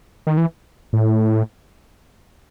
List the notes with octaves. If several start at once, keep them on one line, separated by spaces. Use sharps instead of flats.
D#3
E3
A2